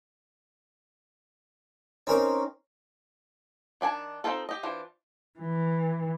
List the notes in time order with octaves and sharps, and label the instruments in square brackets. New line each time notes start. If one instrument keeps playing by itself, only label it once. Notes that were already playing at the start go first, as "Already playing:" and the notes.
[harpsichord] C4 A#4 D6 [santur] C#4 D#4
[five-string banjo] D#3 D4 G#5 A5
C4 C#4 D#4 F4 A4
G4 D#5
E3 D4 F4 C5
[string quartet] E3